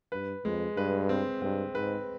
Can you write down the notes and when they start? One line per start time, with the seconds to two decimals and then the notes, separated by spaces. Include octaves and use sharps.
0.12 G2 B4
0.44 F2 G#3
0.77 G2 B4
1.09 C4
1.42 G2 C4
1.74 G#2 B4